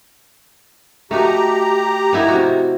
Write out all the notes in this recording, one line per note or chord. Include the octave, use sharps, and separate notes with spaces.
A3 D#4 F#4 G4 A#5
B3 D#4 E4
C3 F#4